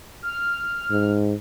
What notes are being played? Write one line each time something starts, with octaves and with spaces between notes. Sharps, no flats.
F6
G#2